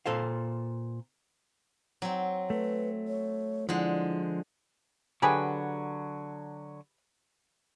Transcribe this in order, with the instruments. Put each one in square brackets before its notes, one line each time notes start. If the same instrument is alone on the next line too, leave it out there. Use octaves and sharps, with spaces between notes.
[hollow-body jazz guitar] A#2 A4 C5 F5
[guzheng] F#3 C4
[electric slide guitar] A3 [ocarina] B4
[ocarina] C#5
[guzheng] D3 G#3 [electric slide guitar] F3 [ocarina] E4
[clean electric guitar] D3 F#3 [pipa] G4 G#4 B4